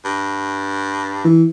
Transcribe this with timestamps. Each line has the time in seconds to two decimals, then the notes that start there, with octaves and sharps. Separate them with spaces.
0.05 G2
1.25 E3